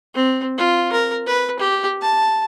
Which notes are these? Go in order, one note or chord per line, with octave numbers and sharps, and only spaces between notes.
C4
F4
A#4
B4
G4
A5